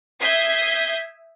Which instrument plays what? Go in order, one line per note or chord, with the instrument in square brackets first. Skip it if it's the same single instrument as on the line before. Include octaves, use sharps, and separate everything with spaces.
[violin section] E5 D#6 G6 G#6 B6 C7